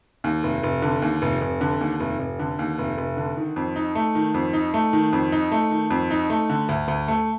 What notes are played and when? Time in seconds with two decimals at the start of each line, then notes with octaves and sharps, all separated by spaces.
0.24 D#2
0.43 F1
0.63 F1
0.82 D3
1.02 D#2
1.22 F1
1.41 F1
1.61 D3
1.81 D#2
2.00 F1
2.20 F1
2.39 D3
2.59 D#2
2.78 F1
2.98 F1
3.17 D3
3.37 D#3
3.56 F2
3.76 D#4
3.95 A3
4.15 D#3
4.34 F2
4.53 D#4
4.74 A3
4.93 D#3
5.13 F2
5.32 D#4
5.52 A3
5.71 D#3
5.90 F2
6.11 D#4
6.30 A3
6.50 D3
6.69 D2
6.88 D2
7.08 A3